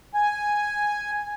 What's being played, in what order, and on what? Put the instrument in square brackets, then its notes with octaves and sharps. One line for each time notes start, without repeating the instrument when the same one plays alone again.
[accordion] G#5